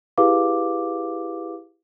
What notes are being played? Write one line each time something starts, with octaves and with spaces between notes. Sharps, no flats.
E4 G4 G#4 B4 F5 D6